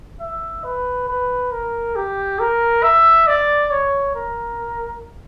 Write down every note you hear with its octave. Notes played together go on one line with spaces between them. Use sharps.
E5
B4
B4
A#4
G4
A#4
E5
D5
C#5
A#4